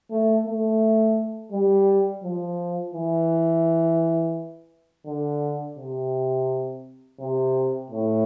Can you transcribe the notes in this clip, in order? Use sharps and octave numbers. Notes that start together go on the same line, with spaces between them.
A3
A3
G3
F3
E3
D3
C3
C3
A2